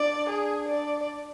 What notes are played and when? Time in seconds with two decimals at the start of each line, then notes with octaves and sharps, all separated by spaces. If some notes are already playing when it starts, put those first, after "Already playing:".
Already playing: D4 D5
0.29 G#4
0.69 D5